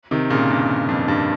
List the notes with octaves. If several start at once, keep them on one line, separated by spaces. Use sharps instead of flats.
C3 D#3
A#2 C#3
G2
F2
G2